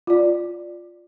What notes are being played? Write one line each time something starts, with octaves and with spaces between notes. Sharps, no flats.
F4 D5